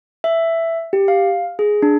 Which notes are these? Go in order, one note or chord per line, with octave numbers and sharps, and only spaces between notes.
E5
G4
F5
G#4
D4